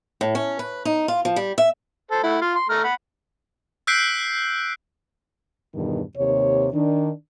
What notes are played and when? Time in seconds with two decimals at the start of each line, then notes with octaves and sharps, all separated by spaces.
0.21 A2
0.35 C#4
0.59 B4
0.85 D#4
1.08 F4
1.25 F3
1.36 G3
1.58 E5
2.11 A4 C5
2.23 A3 E4 F#5
2.41 F4 F5
2.55 C6
2.69 A3 A#5 F6
2.84 F#5 B5
3.87 E6 F#6 G6 B6 C7 D7
5.73 E2 G2 B2 D#3
6.16 D#2 C3 C#5
6.72 D#3 D4